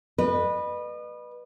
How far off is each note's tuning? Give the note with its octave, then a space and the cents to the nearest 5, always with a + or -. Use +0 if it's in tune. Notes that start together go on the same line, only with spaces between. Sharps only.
B4 -10 D#5 -40